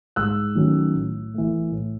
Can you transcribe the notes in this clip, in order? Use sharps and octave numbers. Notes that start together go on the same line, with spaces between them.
G#2 E6 F#6
D#3 F#3 A3 C#4
A2
E3 A3
A2